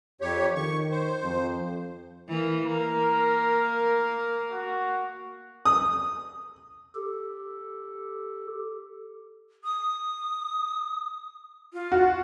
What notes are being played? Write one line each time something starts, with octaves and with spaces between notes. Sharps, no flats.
F2 G4 C#5
D#3 C#6
C5
F2
E3 A#3
A#3 A#4
F#4
D#6
G4 A4
D#6
F4
F#4